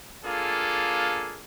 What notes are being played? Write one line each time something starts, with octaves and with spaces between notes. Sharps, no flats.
A#3 D4 F4 G#4 A4